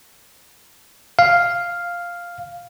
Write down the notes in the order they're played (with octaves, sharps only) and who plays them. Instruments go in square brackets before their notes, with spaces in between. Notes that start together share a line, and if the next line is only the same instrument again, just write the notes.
[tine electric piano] F5